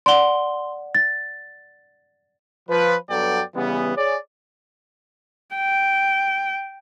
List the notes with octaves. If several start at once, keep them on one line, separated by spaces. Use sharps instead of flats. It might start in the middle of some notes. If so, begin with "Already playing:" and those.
D5 F#5 C6 G7
A6
F3 B4
G2 F#3 B3 A4 D5 G5
C#3 E3 G3 B3
G#4 C#5 D5
G5